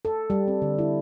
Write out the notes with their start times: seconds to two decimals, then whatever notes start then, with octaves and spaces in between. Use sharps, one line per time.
0.05 A4
0.30 G3
0.48 C4
0.62 D3
0.79 E4